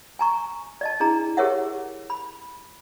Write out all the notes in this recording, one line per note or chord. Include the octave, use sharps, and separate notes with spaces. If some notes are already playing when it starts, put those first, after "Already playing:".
G#5 A#5 C#6
D5 D#5 A5
D4 E4 G#4 A#5
G4 G#4 A#4 C#5 E5 F#5
B5